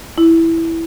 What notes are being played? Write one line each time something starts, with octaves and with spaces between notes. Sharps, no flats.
E4